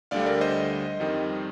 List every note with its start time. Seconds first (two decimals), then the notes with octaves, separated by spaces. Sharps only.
0.11 D2 D3 G3 D5 F5
0.26 A#4 D5
0.41 C5 D#5
1.00 F2 D#3 G3